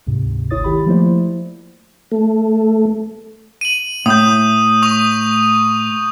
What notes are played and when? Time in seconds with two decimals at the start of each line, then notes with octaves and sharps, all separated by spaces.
0.07 D2 G#2 C3
0.50 G#1 E4 C#5 D#6 A6
0.64 D#3 G4 B5
0.86 F3 A3 A#3 E4 C5 D5
2.12 A3
3.61 D#7 F#7
4.06 A2 D#6 G6
4.82 C#6 D#6 F7